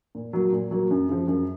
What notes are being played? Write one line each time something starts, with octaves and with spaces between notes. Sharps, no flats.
A#2
F#3 A#3
A#2
F#3 A#3
F#2
C#3 F3
F#2